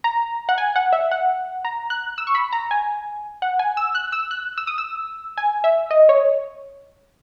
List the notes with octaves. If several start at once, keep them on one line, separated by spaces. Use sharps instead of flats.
A#5
F#5
G#5
F#5
E5
F#5
A#5
F#6
E6
C#6
B5
A#5
G#5
F#5
G#5
E6
F#6
E6
F#6
E6
D#6
E6
G#5
E5
D#5
C#5